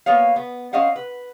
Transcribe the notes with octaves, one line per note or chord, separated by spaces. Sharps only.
A#3 B3 C#5 F5
B3
C4 C#4 D#5 F5 F#5
B4